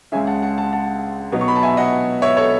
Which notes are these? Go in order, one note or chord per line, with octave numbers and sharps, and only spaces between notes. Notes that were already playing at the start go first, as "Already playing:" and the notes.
C#2 C#3 G#3 C#4 E5 G#5
F#5 A5
F#5 A5
F#5 A5
F#5 A5
B2 F#3 B3 D#4
C#6
B5
A5
E5 G#5
D#5 F#5
C#5 E5
A4 C#5